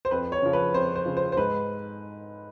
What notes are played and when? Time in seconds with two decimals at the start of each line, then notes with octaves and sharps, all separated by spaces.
0.05 C5
0.11 F2 B4
0.32 C#5
0.42 C#3 F3
0.53 B4
0.74 F2 C5
0.96 C5
1.05 C#3 F3
1.17 C5
1.32 C5
1.37 G#2 B4